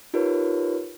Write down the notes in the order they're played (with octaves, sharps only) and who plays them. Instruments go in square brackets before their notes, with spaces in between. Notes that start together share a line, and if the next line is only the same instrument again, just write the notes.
[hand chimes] D#4 F4 G4 A#4 B4 C#5